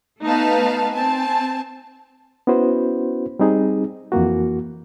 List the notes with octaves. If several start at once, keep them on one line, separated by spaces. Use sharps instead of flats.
A3 B3 D#4 B4 F5 A5
C4 G#5 A5
B3 C#4 E4 F#4 B4 C5
G3 C4 D#4 G#4
F2 E3 A#3 F#4